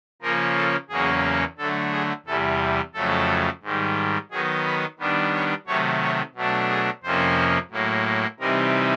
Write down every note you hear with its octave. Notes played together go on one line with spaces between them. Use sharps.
C#3 F3 A#3 C#4 A#4
A4
E2 C#3 F#3 A#3 C#4 G#4
D3 F#3 A3 A4
G#4
E2 C3 E3 G3 A4
F2 C#3 F#3 A3 A4
G#2 D#3 G3
D#3 F#3 B3 D#4 G#4
B4
D#3 G3 B3 D4
C#5
C3 D#3 F#3 A3 C#5
C#5
B2 F#3 A3 D4
G#4
F2 C3 F3 A#3 C#4 C5
A2 F#3 A#3
C3 E3 G3 C4 D#4 A#4